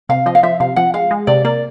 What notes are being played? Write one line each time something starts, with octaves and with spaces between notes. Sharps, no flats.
C3 F5
F3 D#5
F5
F3 E5
C3 F5
F3 F#5
G#3 F5
G#3
C3 D5
A#3 D5